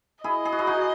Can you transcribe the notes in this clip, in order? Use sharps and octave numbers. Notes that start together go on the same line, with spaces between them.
E4 G#4 D#5
G#4
F#4
E4 G#4
D#4 F#4